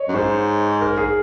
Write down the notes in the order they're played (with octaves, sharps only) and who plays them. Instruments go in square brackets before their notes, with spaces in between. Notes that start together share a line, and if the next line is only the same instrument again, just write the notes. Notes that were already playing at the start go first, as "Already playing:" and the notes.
Already playing: [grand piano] C#5 D#5
[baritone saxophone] F#2
[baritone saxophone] G#2 [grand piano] C5
[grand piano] A#4
G#4